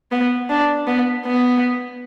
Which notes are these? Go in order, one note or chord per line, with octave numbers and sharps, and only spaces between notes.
B3
D4
B3
B3